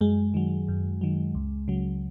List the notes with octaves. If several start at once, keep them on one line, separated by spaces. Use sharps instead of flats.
F#2 G#3
D#3 F#3
F#2
D#3 F#3
C#2
C#3 F#3